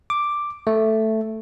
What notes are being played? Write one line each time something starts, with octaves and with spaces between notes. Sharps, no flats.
D6
A3